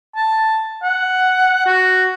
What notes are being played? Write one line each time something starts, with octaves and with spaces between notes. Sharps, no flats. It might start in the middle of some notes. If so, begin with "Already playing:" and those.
A5
F#5
F#4